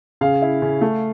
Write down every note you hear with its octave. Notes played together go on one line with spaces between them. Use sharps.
C#3 F5
E4
C#3
A3